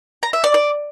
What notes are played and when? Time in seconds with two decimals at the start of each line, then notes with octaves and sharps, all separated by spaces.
0.23 A#5
0.33 E5
0.44 D5
0.54 D5